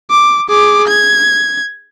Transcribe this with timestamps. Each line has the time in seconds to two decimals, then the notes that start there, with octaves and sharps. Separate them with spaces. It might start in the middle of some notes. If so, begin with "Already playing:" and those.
0.11 D6
0.49 G#4 D6
0.88 G#6